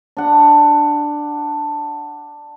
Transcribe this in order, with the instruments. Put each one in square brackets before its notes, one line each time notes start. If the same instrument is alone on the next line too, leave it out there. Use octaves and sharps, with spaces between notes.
[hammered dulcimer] D4 F#5